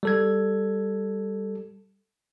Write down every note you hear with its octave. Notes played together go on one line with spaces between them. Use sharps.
G3 A4 G#6